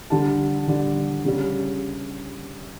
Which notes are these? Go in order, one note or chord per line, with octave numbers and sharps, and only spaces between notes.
D3 G3 D4 A5
D3 G3 D4
C#3 G3 C#4